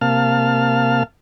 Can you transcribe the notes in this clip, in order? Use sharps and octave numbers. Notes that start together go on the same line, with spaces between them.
C3 A#3 F5 A5 F6